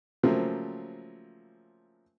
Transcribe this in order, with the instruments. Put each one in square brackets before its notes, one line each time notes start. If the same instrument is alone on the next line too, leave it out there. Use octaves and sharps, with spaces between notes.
[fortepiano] C#3 F3 F#3 A3 A#3 C4